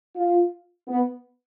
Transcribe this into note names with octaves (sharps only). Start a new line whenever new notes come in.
F4
B3